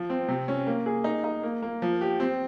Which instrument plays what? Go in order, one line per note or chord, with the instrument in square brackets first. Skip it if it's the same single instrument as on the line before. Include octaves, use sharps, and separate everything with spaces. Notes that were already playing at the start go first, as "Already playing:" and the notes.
Already playing: [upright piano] F3
C4
C3
C#4
A#3
G#4
D#4
D#4
A#3
A#3
F3
G4
C4